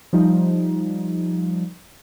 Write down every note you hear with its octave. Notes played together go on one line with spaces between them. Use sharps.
F3 G3 D#4